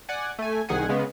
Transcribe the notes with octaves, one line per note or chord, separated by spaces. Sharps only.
D5 F#5 G#5
A3 G#5
C2 D#3 G#4 F#5 G#5
C#3 G#3 B3